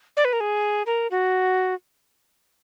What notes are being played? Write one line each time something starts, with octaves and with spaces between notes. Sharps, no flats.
D5
B4
A#4
G#4
A#4
F#4